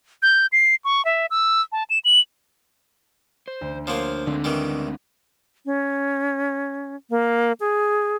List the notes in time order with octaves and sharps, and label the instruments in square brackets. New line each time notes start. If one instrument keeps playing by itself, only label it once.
[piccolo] G6
C7
C#6
E5
E6
A5
E7
F#7
[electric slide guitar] C5
[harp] D2
[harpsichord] F3 F#3 A#3 [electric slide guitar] C5
[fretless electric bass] D3 [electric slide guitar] G#3 A3 C4
[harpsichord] D#3 E3 G3
[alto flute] C#4
A#3
G#4